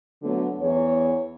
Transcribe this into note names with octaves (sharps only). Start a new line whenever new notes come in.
D3 F#3 A3 B3
E2 C#5